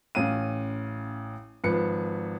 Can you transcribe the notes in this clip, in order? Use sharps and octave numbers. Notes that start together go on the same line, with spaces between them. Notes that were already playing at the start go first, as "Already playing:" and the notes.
A1 C#4 F5 D#7
G#1 F3 B4 C#7